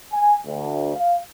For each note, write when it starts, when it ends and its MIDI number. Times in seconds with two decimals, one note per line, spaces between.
0.13 0.34 80
0.46 0.92 38
0.95 1.17 77